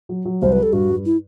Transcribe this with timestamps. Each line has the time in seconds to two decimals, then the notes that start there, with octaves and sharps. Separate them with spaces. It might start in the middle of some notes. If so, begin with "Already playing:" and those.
0.09 F#3
0.25 F#3
0.42 C2 C5
0.52 B4
0.58 G3
0.63 A4
0.73 G2 F#4
0.90 G2
1.06 E4